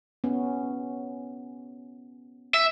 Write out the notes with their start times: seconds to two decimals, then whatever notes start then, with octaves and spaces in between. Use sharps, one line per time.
0.24 B3 C#4
2.54 E5